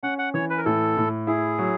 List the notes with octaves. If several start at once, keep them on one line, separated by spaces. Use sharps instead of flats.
C#4 F#5
F#5
E3 C#5
B4
A#4
A2 A4
A2
E4 G#4
F#3